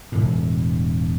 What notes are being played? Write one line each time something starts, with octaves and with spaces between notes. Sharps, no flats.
E1 A2